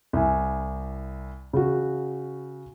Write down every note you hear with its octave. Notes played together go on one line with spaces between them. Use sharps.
C2 G#5
C#3 F#4